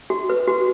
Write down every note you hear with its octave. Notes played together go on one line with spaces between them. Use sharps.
F#4
B4
F#4